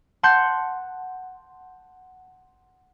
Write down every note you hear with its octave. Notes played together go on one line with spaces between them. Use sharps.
F#5 A5 C6 F#6 G6 C#7